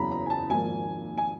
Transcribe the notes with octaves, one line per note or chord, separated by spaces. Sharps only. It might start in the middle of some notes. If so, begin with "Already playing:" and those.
Already playing: F#1 E2 C#3 F#3 A#5 B5
A#5
G#5
A5
G#1 G#2 F3 A#3 G#5
G#5